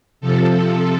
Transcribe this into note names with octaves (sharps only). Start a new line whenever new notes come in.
C3 F3 A4